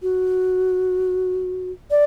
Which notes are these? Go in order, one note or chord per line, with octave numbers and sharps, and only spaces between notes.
F#4
D5